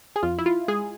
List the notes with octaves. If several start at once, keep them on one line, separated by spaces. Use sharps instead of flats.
G#4
F2 F4
E4
F4
G#3 G#4